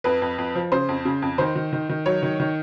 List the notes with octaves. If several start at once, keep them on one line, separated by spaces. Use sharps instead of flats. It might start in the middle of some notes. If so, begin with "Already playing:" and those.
F2 B4
F2
F2
F3
C#3 C5
F2
C#3
F2
D#3 C5
D#3
D#3
D#3
F#3 C#5
D#3
D#3